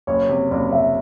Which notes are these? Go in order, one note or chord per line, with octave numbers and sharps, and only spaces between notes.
F#1 C#5
C3
F#1 D5
F#1 E5